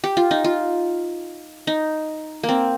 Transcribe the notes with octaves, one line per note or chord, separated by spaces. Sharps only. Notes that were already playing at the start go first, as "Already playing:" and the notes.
G4
F4
D#4
F4
D#4
A#3
C4